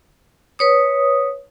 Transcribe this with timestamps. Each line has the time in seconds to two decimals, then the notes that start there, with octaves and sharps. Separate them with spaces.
0.59 B4 C#5 D#6